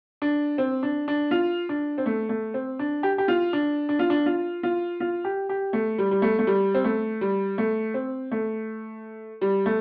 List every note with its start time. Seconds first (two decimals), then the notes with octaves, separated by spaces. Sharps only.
0.22 D4
0.58 C4
0.83 D4
1.08 D4
1.31 F4
1.69 D4
1.98 C4
2.06 A3
2.29 A3
2.54 C4
2.79 D4
3.03 G4
3.18 G4
3.28 F4
3.53 D4
3.89 D4
3.99 F4
4.10 D4
4.26 F4
4.63 F4
5.00 F4
5.25 G4
5.49 G4
5.73 A3
5.98 G3
6.11 G3
6.22 A3
6.39 A3
6.47 G3
6.74 C4
6.84 A3
7.21 G3
7.58 A3
7.94 C4
8.32 A3
9.41 G3
9.66 A3